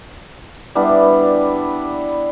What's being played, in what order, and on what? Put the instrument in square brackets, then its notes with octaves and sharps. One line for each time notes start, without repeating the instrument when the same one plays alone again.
[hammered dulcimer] G3 B3 D4 E4